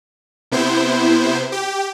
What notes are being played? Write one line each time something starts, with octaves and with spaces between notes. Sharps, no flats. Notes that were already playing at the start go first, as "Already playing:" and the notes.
C3 B3 E4 C5
G4